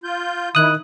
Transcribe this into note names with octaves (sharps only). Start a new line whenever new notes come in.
F4 G6
D#3 E4 D#6 F#6